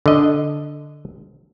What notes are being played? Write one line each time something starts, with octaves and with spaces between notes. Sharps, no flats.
D3 D#5